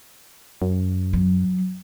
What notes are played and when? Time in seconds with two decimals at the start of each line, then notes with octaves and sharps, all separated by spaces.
0.62 F#2
1.13 F#3